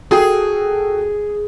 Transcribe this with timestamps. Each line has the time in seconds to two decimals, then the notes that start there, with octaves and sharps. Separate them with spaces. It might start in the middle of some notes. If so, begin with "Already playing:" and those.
0.11 F#4 G#4 A4 G5